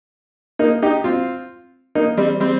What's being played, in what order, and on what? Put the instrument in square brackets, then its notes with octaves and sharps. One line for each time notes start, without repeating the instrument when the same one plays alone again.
[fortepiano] A#3 D#4
D#4 G4
C4 F4
A#3 D#4
G3 C4
G3 C4